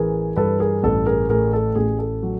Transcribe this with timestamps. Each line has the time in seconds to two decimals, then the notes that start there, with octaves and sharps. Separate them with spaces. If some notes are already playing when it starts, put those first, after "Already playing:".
Already playing: A1 E3 G#4 A#4
0.36 G2 A4 B4
0.60 G#4 A#4
0.83 A1 A4
1.06 G#4 A#4
1.29 A2 G#4 A#4
1.53 A4
1.76 A1 G#4
1.99 A4
2.23 F#3